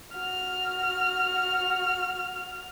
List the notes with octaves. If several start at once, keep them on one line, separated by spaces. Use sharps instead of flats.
F#4 F6